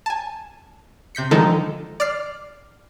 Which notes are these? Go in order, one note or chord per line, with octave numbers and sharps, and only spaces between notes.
G#5 A5
C3 G6 B6 C#7
D3 D#3 F3 G#3 D#4 A4
D5 D6 F6 C7